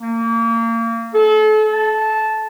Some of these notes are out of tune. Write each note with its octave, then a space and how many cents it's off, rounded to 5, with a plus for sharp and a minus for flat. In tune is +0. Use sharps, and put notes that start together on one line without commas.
A#3 -30
A4 -35
A5 -10